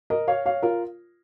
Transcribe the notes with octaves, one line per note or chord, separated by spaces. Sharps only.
A#4 D#5
C#5 F5
C#5 F5
F4 A#4